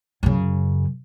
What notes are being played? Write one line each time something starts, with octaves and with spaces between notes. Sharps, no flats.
F#2 C#3